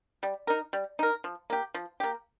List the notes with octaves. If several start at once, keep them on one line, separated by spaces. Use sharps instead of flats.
G3
D#4 A#4
G3
D#4 A#4
F3
A#3 G4
F3
A#3 G4